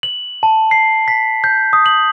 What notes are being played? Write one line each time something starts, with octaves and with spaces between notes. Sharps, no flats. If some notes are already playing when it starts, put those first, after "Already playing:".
F#7
A5
C7
B6
G6
D#6
F#7